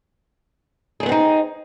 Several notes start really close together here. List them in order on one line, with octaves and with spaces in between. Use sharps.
G#4 D4 B3 C4 D#4